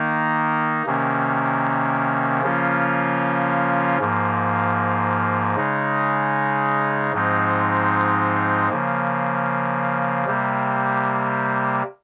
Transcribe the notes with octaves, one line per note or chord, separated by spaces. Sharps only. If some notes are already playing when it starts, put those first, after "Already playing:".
Already playing: D#3 A#3 D#4
C3 D#3 A#3 C#4
C#3 F3 A#3 C#4 F4
G#2 F3 A#3
C#3 G#3 D#4
G#2 F3 G#3 C4 D#4
C#3 F3 A#3
C3 G3 A#3